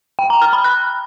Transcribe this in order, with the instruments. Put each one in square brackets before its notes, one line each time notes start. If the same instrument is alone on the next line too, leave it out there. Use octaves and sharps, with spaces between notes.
[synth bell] G5
A#5
F6
B5
F#6